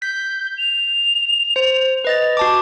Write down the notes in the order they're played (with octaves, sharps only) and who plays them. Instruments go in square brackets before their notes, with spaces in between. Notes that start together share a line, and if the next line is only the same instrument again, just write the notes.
[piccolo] G6 [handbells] B6
[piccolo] F7
[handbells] C5
B4 D#5 A6
F#4 A5 D6